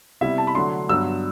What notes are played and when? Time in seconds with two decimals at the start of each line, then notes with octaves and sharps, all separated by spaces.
0.21 C3 G3 B3 E4 E5
0.38 A5
0.47 B5
0.55 D3 F#3 A3 D4 C6
0.89 G2 F#3 B3 D4 E6